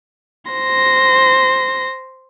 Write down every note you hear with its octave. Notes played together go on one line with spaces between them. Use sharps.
C5 A#6